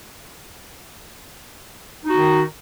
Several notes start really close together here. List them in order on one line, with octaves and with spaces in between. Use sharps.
D#4 F#4 D#3